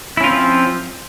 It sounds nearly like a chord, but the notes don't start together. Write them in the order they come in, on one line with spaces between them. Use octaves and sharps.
E4 C#4 F4 C4 F3